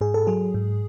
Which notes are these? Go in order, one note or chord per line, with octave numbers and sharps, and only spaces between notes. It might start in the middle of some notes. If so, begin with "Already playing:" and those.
G#2 G#4
A4
F#3 G#4
G#2